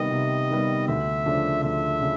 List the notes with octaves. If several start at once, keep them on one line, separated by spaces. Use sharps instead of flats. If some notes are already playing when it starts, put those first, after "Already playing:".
Already playing: C3 D#3 G3 B3 D#5
C3
D#3 G3 B3
D2 E5
C#3 F3 A3 D4
D2 E5
C#3